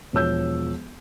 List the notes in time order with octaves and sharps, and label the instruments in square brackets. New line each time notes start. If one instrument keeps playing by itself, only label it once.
[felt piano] E1 F3 C#5 E6 G6